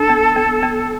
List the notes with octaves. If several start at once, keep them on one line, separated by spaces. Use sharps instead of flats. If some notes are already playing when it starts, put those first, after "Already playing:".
Already playing: D4 A4
B3
B3
B3